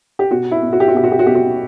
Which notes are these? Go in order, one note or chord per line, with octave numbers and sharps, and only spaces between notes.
G4
B2 F#4
E4
B2
F#4
G4
F#4
B2 G4
F#4
G4
F#4
B2 G4
F#4